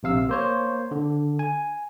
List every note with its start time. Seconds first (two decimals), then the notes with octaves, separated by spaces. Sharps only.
0.03 A#1 C3 F5 E6
0.29 A#3 C5 C#5
0.91 D3
1.39 G#5